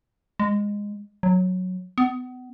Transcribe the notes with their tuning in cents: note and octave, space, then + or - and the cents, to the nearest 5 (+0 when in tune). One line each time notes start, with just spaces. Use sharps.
G#3 -15
F#3 -10
B3 +30